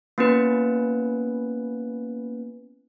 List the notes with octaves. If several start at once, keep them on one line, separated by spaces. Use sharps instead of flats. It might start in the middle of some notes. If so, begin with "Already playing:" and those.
A#3 B3 C#4 E4 B4